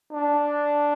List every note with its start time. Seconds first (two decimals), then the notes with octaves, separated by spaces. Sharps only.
0.12 D4